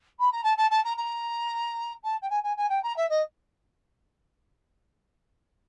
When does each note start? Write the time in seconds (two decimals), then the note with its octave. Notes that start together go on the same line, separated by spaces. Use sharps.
0.19 B5
0.31 A#5
0.43 A5
0.57 A5
0.70 A5
0.84 A#5
0.97 A#5
2.03 A5
2.22 G5
2.29 G#5
2.43 G#5
2.56 G#5
2.69 G5
2.82 A#5
2.96 E5
3.09 D#5